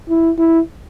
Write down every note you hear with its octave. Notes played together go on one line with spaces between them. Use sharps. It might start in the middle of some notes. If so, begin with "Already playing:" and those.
E4
E4